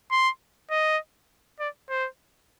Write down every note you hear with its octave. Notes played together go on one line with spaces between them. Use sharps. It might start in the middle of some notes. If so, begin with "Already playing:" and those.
C6
D#5
D5
C5